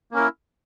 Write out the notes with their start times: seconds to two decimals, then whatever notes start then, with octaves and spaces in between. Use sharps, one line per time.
0.11 A#3
0.14 C#4
0.16 A#4
0.19 E4